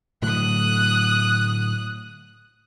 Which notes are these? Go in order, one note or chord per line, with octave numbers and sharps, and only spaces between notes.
A2 D3 F#3 D#6 F#6